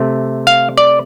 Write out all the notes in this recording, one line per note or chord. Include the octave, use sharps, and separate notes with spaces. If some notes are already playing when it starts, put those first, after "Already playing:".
Already playing: C3 A3
F5
D5